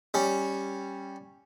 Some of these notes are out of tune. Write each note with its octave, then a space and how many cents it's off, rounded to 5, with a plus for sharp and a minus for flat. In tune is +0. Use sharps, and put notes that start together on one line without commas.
G3 +0 C#4 -10